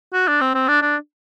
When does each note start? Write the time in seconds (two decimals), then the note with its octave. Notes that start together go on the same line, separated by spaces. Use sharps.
0.13 F#4
0.28 D4
0.41 C4
0.55 C4
0.68 D4
0.82 D4